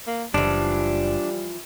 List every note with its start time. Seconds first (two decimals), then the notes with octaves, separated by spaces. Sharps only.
0.07 A#3
0.34 F#1 E3 F3 G3 D4